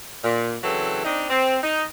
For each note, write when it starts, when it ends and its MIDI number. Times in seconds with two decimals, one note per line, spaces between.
0.24 0.55 46
0.63 1.03 49
0.63 1.03 52
0.63 1.03 54
0.63 1.03 60
0.63 1.03 69
1.05 1.25 60
1.05 1.25 62
1.05 1.25 63
1.30 1.58 60
1.63 1.84 63